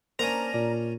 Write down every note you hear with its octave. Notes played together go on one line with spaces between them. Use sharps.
A#3 C#4 D4 A#4 C5 A#5
A#2 D5